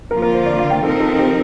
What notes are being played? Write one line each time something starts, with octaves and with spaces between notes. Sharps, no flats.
D3 F3 A#3 F4 A#4
A#4
C5
D5
F5
G5
F3 C4 D#4 A4 A#4
A4
G4